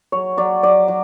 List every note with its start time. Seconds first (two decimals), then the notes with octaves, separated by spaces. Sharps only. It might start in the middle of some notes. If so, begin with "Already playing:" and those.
0.12 F#3 C#5
0.37 F#3 D5
0.63 F#3 D5
0.88 F#3